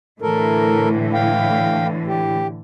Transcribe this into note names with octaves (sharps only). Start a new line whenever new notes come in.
A2 D3 E3 A4 A#4
F5 G5
G4